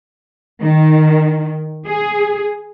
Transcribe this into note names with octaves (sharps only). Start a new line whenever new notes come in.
D#3
G#4